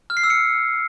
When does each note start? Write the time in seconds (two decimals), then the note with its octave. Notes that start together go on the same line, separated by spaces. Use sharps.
0.10 F6
0.17 C7
0.23 E6
0.30 C#7